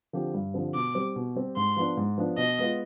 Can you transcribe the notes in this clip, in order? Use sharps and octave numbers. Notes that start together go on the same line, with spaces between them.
D3 F3 C4 G4
G2
D3 F3 C4 G4
B2 D6
G3 C4 G4
B2
G3 C4 G4
G#2 C6
F3 B3 D4
G#2
F3 B3 D4
B2 D#5
G#3 B3 F4